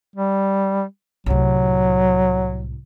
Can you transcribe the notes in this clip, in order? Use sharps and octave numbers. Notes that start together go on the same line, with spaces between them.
G3
C2 A2 F#3